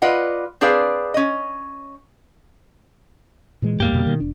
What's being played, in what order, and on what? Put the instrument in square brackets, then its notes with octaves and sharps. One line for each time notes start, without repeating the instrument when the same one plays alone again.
[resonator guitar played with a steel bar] F4 B4 D5 D#5 F#5
C4 D4 G#4 B4 D5 F5
C#4 D#5
[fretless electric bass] A#2 E3 G#3
[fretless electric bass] D#2 G#2 [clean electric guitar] G3 A#3 G4
[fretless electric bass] F2 B2 D3
B2 D#3
E1 D4